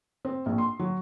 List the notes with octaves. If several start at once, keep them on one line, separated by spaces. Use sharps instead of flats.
C4
A#1
C6
F#3